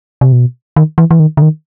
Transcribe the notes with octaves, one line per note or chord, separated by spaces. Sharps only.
C3
B2
D#3
E3
E3
D#3
D3
D#3